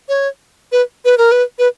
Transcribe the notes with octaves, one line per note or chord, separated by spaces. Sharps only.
C#5
B4
B4
A#4
B4
B4